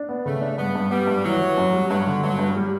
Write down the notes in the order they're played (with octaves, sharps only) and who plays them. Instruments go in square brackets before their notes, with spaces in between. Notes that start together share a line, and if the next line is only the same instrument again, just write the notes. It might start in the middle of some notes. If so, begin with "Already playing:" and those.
Already playing: [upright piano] D4
B3
[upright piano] C#3 [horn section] A3
[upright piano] D4
[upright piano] G2 [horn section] B3
[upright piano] G2
[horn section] G3 [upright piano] B3
[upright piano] G2
[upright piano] E3 [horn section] F#3
[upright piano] E3
F#2
G3
[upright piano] G2 [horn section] F#3
[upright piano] D3
[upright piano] G2 [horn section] F#3
[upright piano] G2
G3